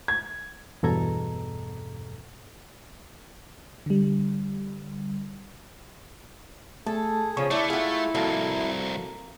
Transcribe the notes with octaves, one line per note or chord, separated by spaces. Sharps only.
G#6
E2 G2 B2 A4 A#5 G#6
D3 G3
A3 G#4 A4
C#3 F3 C#4 C#6
A3 D4 E4
F4 F#4 G#4
C2 F2 A#3 F#4 A4 A5